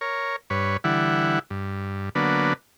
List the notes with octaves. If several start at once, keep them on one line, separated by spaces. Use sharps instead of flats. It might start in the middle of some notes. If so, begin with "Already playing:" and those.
A#4 C#5
G2 B4 C#5
D3 E3 G3 E4 F#5
G2
D3 F#3 A#3 B3 D4 B4